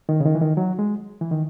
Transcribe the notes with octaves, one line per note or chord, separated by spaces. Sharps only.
D#3
C#3
D#3
E3
D#3
F#3
G#3
E3
D#3